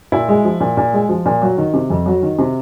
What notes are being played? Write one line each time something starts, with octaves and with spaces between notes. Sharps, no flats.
A#2 E4
G#3
F3
A#2
A#2
G#3
F3
A#2
F#3
D#3
C3
F2
F#3
D#3
C3